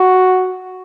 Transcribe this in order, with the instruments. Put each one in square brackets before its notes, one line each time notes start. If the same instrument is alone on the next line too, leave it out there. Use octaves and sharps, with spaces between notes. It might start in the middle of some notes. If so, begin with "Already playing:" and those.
Already playing: [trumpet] F#4